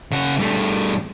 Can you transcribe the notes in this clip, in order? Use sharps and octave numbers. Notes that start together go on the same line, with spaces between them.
C#3 F#5
G2 A3